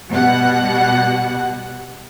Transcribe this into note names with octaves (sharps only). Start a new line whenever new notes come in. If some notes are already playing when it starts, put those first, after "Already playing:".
B2 G3 F#5